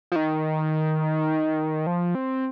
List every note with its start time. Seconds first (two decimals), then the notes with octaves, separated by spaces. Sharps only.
0.12 F3
0.16 D#3
1.87 F3
2.15 C4